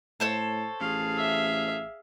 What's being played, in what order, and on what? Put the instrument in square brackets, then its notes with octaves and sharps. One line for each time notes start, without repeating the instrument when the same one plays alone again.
[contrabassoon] A2 [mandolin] A4 C5 C#5
[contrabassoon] A1 [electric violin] G#4 F5
[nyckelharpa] E5